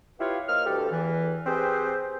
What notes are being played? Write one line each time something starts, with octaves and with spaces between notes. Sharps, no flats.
E4 F4 G4 B4 C#5 F5
A#3 C5 D#5 F6
D2 G2 G4 A4
E2 E3
C4 G4 G#4 B4 C5